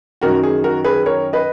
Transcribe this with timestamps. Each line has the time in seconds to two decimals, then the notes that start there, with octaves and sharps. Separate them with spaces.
0.21 F#2 D#3 F#3 F#4 A#4
0.43 G#4
0.64 F#4 A#4
0.84 G#4 B4
1.06 A#4 C#5
1.33 B4 D#5